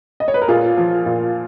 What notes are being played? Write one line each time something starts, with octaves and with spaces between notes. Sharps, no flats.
D#5
C#5
B4
A#4
A#2 F4 G#4
F3
A#2